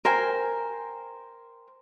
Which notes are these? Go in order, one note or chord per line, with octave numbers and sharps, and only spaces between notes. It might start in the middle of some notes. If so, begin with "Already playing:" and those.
A#4 C5 G5 G#5